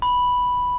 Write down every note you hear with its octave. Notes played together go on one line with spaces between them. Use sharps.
B5